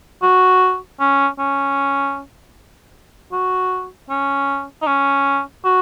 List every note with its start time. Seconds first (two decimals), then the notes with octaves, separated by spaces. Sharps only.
0.23 F#4
1.00 C#4
1.39 C#4
3.32 F#4
4.10 C#4
4.82 D#4
4.87 C#4
5.65 F#4